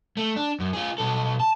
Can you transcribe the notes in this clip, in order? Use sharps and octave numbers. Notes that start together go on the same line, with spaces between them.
A3
D4
F#2
F4 G#4
B2 A4
A5